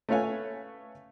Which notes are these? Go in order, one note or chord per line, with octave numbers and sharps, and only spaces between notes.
A3 C#4 B4 C#5 F5 G#5